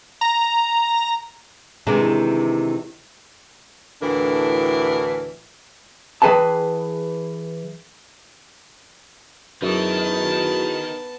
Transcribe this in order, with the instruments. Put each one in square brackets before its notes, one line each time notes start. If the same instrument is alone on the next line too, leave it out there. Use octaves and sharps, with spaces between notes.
[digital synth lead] A#5
[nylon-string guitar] C3 D#3 E3 G#3 D4
[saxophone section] D2 A2 E3 D4 A#4
[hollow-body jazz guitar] E3 G#4 B4 G5 A5
[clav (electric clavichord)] F#2 [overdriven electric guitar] D#3 [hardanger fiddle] B3 A5 [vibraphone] E4 F#4 G#4